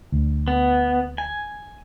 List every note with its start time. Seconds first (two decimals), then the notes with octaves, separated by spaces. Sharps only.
0.12 D2
0.48 B3
1.18 G#5